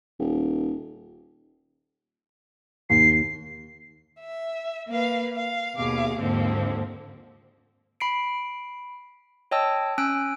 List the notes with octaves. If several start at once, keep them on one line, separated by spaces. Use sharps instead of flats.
D#1
D#2 C7
E5
A#3 B4 F5
F5
D#2 B2 G#4 F5 D6
D#2 G#2 D3 F3 A#3 C4
B5 C7 D7
C#5 D#5 G5 A5 E6
C#4 G#5 E6 F#6 D7